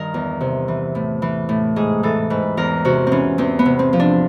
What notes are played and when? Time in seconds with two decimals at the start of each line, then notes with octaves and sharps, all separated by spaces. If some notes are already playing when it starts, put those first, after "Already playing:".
Already playing: G2 D#3 A#4
0.14 E2
0.41 C3
0.68 E3
0.95 A2
1.22 E3
1.49 A2
1.76 G#2 G#4
2.03 E3 A4
2.30 G#2 B4
2.57 E2 A#4
2.85 C3 F#4
3.07 E3 C4 C#4
3.38 E2 C4
3.59 B3
3.65 C3
3.79 C4
3.93 F3
4.00 D4